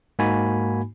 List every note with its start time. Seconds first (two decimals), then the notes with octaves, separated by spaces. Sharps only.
0.19 G#2 A#3 D#4 F#4 G#5 B5